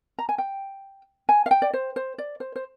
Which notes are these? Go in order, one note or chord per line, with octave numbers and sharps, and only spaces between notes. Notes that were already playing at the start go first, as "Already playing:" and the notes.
A#5
G#5
G5
G#5
F5
G5
D5
C5
C5
D5
C5
C5